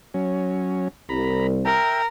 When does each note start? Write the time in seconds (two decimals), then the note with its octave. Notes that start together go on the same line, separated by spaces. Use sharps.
0.14 F#3 C#4
1.09 C2 A#5 B5
1.65 A#4 E5 G5